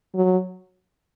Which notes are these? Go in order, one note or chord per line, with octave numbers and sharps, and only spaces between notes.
F#3